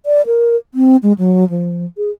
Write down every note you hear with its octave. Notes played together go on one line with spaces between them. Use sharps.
D5
A#4
C4
G#3
F#3
F3
G#4